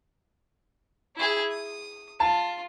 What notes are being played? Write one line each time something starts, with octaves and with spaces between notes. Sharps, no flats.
E4 G#4
D#6
F4 A5